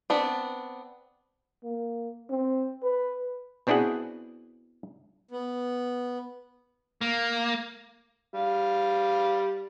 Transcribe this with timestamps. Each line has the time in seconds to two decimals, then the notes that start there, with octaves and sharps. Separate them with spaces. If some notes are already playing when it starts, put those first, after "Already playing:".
0.10 B3 C4 D4
1.64 A#3
2.30 C4
2.83 B4
3.67 B2 C4 D4 E4 G#4 F#5
5.31 B3
7.01 A#3
8.34 G3 F5